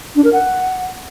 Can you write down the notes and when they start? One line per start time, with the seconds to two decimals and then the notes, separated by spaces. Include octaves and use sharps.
0.16 D4
0.24 A#4
0.33 F#5